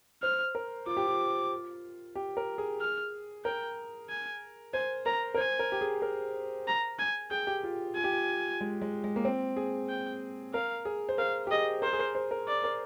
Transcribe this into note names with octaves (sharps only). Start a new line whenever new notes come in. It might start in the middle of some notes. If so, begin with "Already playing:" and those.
C5 F6
A#4
F4 D6
G4
F4
G4
A#4
G#4
F6
A#4 G5
G#5
C5 G#5
A#4 A#5
A#4
C5 G#5
A#4
G4
G#4
A#4
A#5
G#5
G#4 G5
G4
F4
F4 G#5
G4
F4
G#3
G#3
G#3
A#3
C4
G#4
G5
A#4 F5
G#4
C5
A#4 F5
G4
G#4 D#5
A#4 C5
G#4
A#4
C5
A#4
D5
A#4